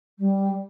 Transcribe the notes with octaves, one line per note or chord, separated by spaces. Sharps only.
G3